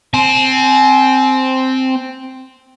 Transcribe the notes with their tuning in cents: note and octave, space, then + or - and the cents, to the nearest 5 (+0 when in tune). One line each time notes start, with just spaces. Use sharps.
C4 +0 G#5 +40